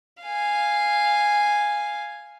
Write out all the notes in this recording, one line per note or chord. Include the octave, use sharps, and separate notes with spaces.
F5 G#5